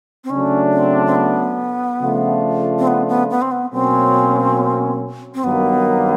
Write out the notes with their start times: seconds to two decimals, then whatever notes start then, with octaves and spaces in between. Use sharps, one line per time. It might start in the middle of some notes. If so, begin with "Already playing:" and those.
0.24 C4
0.30 C#3 F#3 A3 C#4 D4
0.73 C4
1.06 C4
1.15 B3
2.01 C#3 F3 A3 D4 F4
2.79 C4
2.87 B3
3.08 B3
3.30 B3
3.42 C4
3.51 B3
3.73 B2 F#3 A#3 C4 C#4
5.34 C4
5.44 G2 D#3 F#3 A#3 B3